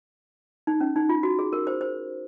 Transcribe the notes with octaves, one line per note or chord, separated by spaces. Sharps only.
D#4
C#4
D#4
F4
F#4
G#4
A#4
C5
C5